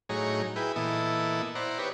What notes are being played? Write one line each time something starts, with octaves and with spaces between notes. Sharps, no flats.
A2 F#3 D#4 G#4 C#5 A#5
E4 G#4 B4 G5
A#2 E3 B3 E4 A4 D#5
E4 C5 D5 F#5 A#5
D#4 G4 B4 C#5